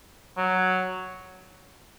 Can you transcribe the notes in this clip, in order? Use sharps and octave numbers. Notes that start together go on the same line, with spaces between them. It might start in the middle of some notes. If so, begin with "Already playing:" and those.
F#3